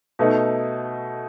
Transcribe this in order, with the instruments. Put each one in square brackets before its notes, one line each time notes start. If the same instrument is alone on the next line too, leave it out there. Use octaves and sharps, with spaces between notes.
[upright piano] B2 A3 D#4